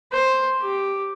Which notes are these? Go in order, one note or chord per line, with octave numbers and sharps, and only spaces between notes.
C5
G4